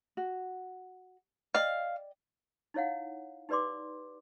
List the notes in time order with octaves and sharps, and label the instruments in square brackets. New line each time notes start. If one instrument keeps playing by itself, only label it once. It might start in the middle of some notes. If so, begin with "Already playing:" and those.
[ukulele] F#4
[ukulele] D5 D#5 G5 [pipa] F5
[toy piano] D#4 E4 C#5 F5 F#5
D#4 G4 B4 D5 C6 D6